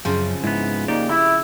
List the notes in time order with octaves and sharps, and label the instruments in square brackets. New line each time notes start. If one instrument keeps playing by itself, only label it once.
[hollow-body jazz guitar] F#2 [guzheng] C#3 F3 C4
[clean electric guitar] G#2 B3 [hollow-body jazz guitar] E4
[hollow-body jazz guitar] A#3 D#4 D5 [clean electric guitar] G4
[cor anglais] E4 [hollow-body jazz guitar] E5 B5